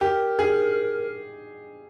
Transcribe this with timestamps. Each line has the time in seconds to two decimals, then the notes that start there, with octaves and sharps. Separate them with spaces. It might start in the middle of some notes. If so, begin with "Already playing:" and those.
0.01 G4 A#4
0.39 G#4